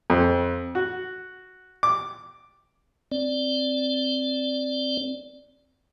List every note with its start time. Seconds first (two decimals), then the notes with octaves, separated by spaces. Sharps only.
0.10 F2
0.75 F#4
1.83 D6
3.12 C4 D5